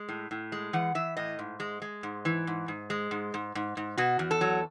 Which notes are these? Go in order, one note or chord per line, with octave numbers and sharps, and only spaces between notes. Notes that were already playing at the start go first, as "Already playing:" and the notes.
Already playing: G#3
A2
A2
G#3
E3 F#5
E3 E5
A2 D#5
G#2
G#3
G#3
G#2
E3
G#2
G#2
G#3
G#2
G#2
G#2
G#2
B2 F#4
E2
A4
F#3